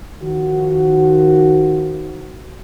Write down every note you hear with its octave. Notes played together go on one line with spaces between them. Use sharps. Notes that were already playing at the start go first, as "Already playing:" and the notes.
D#3 F3 F#4